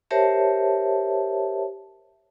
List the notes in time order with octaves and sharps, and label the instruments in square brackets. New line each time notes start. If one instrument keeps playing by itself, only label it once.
[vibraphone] G4 A#4 C5 C#5 E5 A5